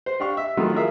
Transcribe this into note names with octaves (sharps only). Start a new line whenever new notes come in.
C5
D4 G4 F5 C#6
E5
D#3 F#3 A3 E4 F4
F3 G#4 A#4 E5 F5